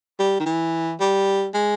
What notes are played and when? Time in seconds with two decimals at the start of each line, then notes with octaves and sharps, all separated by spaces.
0.19 G3
0.40 D#3
0.46 E3
1.00 G3
1.54 G#3